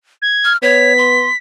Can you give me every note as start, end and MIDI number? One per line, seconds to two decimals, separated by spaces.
0.22 0.53 92
0.45 0.57 89
0.62 1.27 59
0.62 0.93 73
0.62 1.37 95
0.98 1.30 84